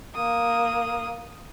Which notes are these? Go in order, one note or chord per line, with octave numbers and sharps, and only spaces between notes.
A#3 D#6